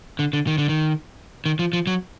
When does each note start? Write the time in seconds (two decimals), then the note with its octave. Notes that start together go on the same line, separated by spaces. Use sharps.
0.19 D3
0.33 D3
0.47 D#3
0.58 D3
0.69 D#3
1.46 D#3
1.59 F3
1.73 F3
1.87 F#3